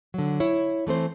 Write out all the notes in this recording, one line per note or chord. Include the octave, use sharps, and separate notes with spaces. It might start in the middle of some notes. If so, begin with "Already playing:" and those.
D3 F#3
E4 C#5
E3 A3 C4 C5